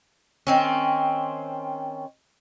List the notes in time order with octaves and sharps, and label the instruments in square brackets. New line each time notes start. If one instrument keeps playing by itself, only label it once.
[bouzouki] D#3 C4 C#4